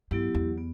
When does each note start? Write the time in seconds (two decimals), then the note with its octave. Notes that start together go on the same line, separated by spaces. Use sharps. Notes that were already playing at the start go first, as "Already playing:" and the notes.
0.11 G2 F#3 B3 E4 G4
0.35 E2
0.58 B3